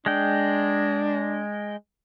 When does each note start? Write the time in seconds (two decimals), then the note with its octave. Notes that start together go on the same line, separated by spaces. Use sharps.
0.06 G#3 D4 G5